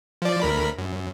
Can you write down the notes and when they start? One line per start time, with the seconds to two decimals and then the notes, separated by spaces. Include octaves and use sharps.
0.22 F3 D5
0.42 D2 A#4 B5
0.78 F#2